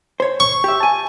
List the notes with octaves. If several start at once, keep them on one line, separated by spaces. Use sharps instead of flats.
C5 C#5
C#6
G4 E5
G#5 A5